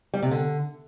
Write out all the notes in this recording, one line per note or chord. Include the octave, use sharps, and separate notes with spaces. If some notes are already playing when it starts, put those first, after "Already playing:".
G3
C3
D3